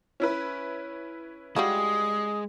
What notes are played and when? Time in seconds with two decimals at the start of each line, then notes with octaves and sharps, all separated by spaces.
0.20 C#4 E4 B4
1.56 G3 G#3 F4 F#4 D#6